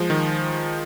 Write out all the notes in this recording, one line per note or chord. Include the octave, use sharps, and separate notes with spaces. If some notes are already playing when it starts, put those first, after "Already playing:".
Already playing: F3 G#3
D#3